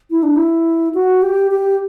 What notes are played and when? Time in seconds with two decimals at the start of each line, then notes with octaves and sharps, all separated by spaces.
0.11 E4
0.23 D4
0.35 E4
0.94 F#4
1.22 G4
1.51 G4